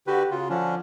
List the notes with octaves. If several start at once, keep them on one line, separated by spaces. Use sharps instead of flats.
D3 F#4 G4 B4
C#3 F4 F#4
D3 F3 C#4 D4